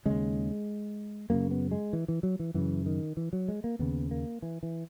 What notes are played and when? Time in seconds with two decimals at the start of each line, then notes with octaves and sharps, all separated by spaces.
0.06 D#2 C#3 G#3
1.30 F#2 C#3 A#3
1.51 B3
1.71 G#3
1.93 E3
2.08 E3
2.23 F#3
2.39 E3
2.54 F#2 C#3 E3
2.86 D#3
3.17 E3
3.33 F#3
3.48 G#3
3.64 A#3
3.79 D#2 C#3 B3
4.11 A#3
4.42 E3
4.63 E3